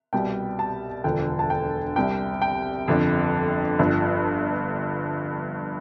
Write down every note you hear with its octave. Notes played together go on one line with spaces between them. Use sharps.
C2 B2 G3 G5
A5
E1 D2 D3 F3 G5
A5
G5
C2 C3 G3 G5
G5
G1 F2 D3
G1 G2 F3